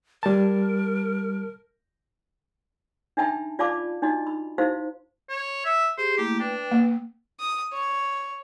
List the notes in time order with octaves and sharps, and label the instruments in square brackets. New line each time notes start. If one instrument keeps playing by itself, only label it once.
[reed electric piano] G3 A5 [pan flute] A#4
[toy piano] D4 D#4 E5 G5 A5 B5
F4 D5 F5 A5 B5 D6
D4 D#4 F#4 D#5
B5
D#4 E4 F#4 C5 F5
[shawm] C#5
E5
[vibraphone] G4 G#4 [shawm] C5
[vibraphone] A3 A#3 E4 [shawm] G4
[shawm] D4 [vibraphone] B4 G5
[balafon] A#3
[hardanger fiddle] D#6
C#5